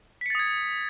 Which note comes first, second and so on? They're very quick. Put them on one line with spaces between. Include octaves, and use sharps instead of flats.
B6 C#7 A6 D#6 G#6